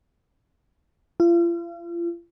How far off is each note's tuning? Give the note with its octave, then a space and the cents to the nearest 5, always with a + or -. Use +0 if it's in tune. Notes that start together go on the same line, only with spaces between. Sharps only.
F4 -40